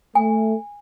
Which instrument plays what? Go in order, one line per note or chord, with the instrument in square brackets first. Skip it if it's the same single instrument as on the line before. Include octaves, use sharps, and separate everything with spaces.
[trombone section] A3 [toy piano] G#5